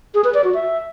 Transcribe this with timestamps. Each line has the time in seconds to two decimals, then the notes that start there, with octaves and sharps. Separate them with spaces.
0.14 G#4
0.24 B4
0.34 D5
0.44 F#4
0.54 E5